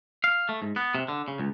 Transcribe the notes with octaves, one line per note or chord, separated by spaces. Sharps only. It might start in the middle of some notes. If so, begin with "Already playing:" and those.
F5
A3
G#2
B3
C3
D3
C#3
C#2